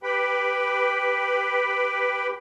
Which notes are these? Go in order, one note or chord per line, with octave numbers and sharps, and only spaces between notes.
G4 B4 G5 B5